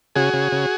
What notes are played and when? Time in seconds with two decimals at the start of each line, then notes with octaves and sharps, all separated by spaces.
0.16 C#3 F#4 G#4
0.34 C#3
0.52 C#3